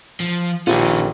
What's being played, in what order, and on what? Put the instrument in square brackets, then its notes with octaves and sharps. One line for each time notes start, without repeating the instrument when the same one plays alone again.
[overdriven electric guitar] F3
[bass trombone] A#1 [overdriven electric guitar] D#3 C#4 [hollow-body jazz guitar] F4 G4 D5